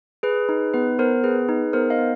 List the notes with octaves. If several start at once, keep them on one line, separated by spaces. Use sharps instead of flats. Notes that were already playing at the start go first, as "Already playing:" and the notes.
G#4 B4
D#4
B3 B4
B3 A#4 C5
G#4 B4
D#4
B3 A#4 C5
D#5 F5
B3